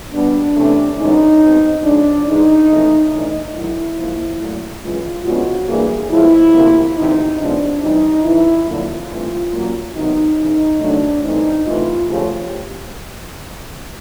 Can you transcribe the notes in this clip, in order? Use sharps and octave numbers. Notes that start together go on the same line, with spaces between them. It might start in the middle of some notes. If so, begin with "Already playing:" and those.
B2 G3 B3 D4
C3 E3 A3 C#4
F#2 C#3 E3 G#3 C#4 D#4
B2 G#3 C4
C#3 F3 G#3 D4
G#2 E3 G#3 D#4
F2 C#3 E3 A3
A2 E3 A3 D4 D#4
G#2 D#3 F#3 E4
G#2 F3 A#3
A#2 F#3 A3 C#4
F#2 C#3 E3 G#3 F4
C#3 F3 G#3 B3 D4 F#4
A2 E3 G3 A#3 D4 G#4
A2 F3 G#3 B3 E4
D2 C3 F3 A#3
D2 C3 E3 D#4
C3 F3 G#3 B3 D4
C3 E3 G3 D#4
F2 C#3 E3 E4
F2 D3 F#3 A#3 D4 F4
G2 E3 A3 C4
A#2 F#3 A#3 C#4
C3 D#3 F#3 B3 D#4
E2 C#3 E3 D#4
D2 C3 D#3 F#3 A3 D4
G2 E3 A3 C4 D#4
C3 E3 A3 F4
D2 C#3 F3 A3 C#4 G4